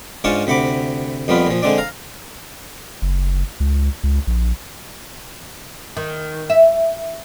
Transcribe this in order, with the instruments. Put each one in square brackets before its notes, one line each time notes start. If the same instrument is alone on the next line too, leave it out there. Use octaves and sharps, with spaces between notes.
[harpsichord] G#2 C#4 D4 F4 A5 C#6
D2 C3 F#5 B5 D6
F2 G3 B3 F4 B4
A#2 F3
D3 G#3 C4 D4 D5
F5 A#5
[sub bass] F#1
C#2
C#2
A#1
[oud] D#3
E5